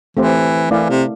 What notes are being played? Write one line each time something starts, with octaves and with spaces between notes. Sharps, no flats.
E3 A3 C4 G4 C5
E3 A3 E4 A#4 D5 F5
C3